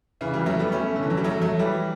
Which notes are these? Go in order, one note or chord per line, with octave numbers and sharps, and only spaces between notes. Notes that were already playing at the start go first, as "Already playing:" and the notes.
C#3 E3
E3 G3
F#3 A3
G3 B3
A3 C#4
D3
E3
F#3
G3
F#3 A3
F#3 A3
E3 G3